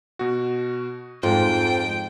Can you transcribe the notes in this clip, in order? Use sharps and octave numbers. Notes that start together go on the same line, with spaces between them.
B2 F#4
F2 G#2 F4 G5